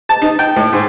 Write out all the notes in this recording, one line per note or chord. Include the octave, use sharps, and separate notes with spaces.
A5
D#4
G5
A2
G#2